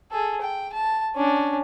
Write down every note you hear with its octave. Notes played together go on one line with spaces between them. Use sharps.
G#4 A4
G5
A5
C#4 D4